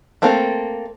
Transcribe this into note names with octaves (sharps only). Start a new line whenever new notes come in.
A3 A#3 C4 A4